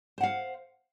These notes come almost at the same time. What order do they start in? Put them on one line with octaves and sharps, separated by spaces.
C5 F#5 F5